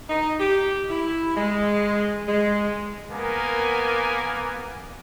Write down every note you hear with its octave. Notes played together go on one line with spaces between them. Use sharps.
D#4
G4
E4
G#3
G#3
A#3 B3 A#4 G#5